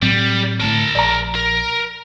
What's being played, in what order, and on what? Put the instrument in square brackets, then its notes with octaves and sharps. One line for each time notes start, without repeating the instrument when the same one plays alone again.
[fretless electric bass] A2 F#3 C4 [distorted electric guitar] G3
[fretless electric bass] D2 A2 [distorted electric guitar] A#4 A5
[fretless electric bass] A#1 [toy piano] D5 A#5
[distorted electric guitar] A#4